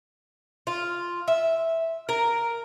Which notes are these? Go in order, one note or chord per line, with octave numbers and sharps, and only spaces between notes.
F4
E5
A#4